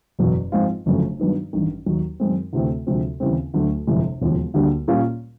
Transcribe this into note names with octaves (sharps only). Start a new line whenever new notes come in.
F#1 E2 B2 F#3
G#2 F3 G#3 C4 F4
G1 F2 C#3 F#3 A3
G2 D#3 F#3 B3 D#4
A1 G2 D#3
D#2 D#3 F#3
F#2 D#3 G#3 C4
D2 C3 E3 A3 C4
D2 C3 F3 G#3 C4
D#2 C#3 E3 G3 C4
D2 D3 F#3 A3
G1 F2 C3 E3 G#3
E1 D#2 C#3 F3
D2 D3 G3 A#3
A#2 G3 A#3 C#4 F4